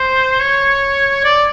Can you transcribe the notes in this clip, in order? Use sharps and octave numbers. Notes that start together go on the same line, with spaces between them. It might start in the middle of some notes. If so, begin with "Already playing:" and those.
Already playing: C5
C#5
D5